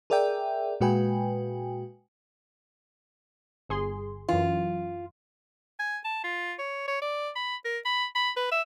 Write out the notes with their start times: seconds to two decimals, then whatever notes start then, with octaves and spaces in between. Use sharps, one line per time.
0.10 G#4 A#4 D5 E5 G5
0.81 A#2 G#3 F#4 B4 G5 G#5
3.69 G1 G#4 C6
4.29 F#2 E3 F4
5.79 G#5
6.04 A5
6.24 F4
6.59 C#5
6.88 C#5
7.01 D5
7.36 B5
7.65 A#4
7.85 B5
8.15 B5
8.36 B4
8.51 E5